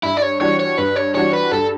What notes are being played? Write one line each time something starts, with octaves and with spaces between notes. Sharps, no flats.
G2 E4
D5
C#5
E3 G3 D4 F#4 C#5
C#5
G2 B4
C#5
E3 G3 D4 F#4 C#5
B4
G2 A4